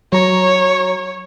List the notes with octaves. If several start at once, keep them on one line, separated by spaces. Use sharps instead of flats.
F#3 C#5 A#5 C#6